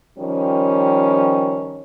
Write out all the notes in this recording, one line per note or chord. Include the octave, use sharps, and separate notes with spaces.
D#3 F3 G3 C#4